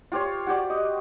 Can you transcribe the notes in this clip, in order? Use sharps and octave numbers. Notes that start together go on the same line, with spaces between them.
F4 G4 C5 C#5
F#4 G4 D5
D#5